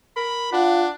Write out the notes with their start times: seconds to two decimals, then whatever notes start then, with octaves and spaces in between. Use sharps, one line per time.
0.17 A#4 B5
0.52 D4 F4 F#5